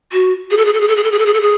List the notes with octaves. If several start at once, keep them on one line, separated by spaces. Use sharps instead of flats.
F#4
G#4
A4
G#4
A4
G#4
A4
G#4
A4
G#4
A4
G#4
A4
G#4